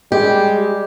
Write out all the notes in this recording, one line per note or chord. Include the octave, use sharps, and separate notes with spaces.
G3 G#3 G4